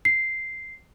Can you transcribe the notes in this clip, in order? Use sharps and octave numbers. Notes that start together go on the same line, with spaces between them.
C7